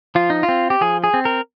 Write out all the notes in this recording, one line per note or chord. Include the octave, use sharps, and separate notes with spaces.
F3 F4
D#4
F4
C4
G4
F3 G#4
G#4
C4
A#4